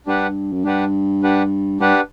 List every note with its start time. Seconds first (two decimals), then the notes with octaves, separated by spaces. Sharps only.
0.06 G2 D4 G4 B4 F#5
0.53 F#2
0.65 G2 D4 G4 B4 F#5
1.23 D4 G4 B4 F#5
1.80 G2 D4 G4 B4 F#5